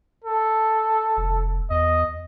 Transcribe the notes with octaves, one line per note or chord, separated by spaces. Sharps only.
A4
F1
E2 D#5